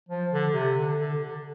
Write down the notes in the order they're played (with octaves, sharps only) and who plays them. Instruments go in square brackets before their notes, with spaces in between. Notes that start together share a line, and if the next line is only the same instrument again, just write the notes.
[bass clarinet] F3
D3
C3
D3
D3
D3